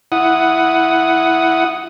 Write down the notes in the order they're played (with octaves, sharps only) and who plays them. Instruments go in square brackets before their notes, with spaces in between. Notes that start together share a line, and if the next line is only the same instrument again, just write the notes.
[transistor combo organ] E4 F#5 D#6